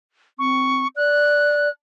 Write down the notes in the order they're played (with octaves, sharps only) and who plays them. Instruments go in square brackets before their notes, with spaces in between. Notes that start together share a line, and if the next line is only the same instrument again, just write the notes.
[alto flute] C4 [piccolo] C#6
[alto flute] D5 [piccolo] F#6